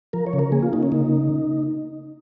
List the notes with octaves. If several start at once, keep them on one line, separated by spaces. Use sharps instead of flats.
F3 A#4
C#5
C#3
A#4
A#3 G#4
F4
A#3 D#4
C#4
C#3 D#4